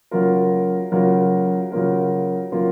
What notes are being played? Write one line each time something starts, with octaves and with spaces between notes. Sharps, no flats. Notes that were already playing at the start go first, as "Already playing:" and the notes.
C#3 F#3 A#3 F4 A#4
C#3 F#3 A#3 F4 A#4
C#3 F#3 A#3 F4 A#4
C#3 F#3 A#3 F4 A#4